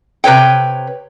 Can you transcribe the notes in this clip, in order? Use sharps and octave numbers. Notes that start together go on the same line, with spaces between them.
C3 B4 C#5 G5